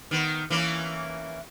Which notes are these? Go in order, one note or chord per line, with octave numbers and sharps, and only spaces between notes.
D#3 B3
E3 A#3 C#4